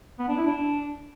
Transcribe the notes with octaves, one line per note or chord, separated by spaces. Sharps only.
B3
D4
E4
D4